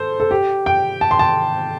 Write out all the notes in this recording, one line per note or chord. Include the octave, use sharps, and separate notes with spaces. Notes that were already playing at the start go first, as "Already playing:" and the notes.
Already playing: A4 C5
A4
G4
G5
A5
C6
A5